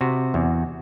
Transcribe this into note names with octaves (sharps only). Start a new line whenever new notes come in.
C3 F#4
E2